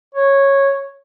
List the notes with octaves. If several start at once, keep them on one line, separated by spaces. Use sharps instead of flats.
C#5